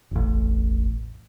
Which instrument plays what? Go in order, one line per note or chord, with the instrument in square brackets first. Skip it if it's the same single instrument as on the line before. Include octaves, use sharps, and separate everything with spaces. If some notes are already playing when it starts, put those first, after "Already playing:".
[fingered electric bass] E1 A1